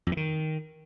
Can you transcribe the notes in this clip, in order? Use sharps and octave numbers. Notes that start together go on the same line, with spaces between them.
F2
E3
D#3